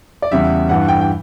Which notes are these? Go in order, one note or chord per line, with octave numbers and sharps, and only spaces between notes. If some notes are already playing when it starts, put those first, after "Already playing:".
D5
E2 C#3 G3 E5
G2 E3 G3 F#5
G5
G5